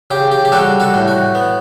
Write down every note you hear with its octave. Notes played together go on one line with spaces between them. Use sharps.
C#3 G4
G4
G4
G3 F#4 A4
F#4 A4
A2
F#4
B3